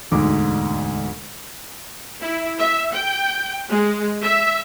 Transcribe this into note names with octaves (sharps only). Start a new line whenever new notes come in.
E1 D2 G#2 D6
E4
E5
G5
G#3
E5